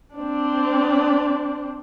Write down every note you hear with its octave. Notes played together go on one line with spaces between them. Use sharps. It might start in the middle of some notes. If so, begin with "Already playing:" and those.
C4 D4